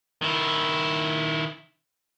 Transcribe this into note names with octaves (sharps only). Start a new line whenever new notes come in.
D#3 E4